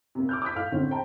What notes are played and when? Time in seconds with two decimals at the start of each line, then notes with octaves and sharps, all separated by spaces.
0.15 C3 A#3
0.29 D6 F6 G6
0.42 D6 D#6 G6 B6
0.55 A2 F5 F6
0.72 A2 D3 C4 C#4
0.91 C5 G5 A5 A#5